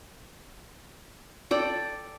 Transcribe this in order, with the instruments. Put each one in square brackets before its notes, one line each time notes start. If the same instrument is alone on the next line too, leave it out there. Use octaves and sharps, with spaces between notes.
[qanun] A4 D5 G5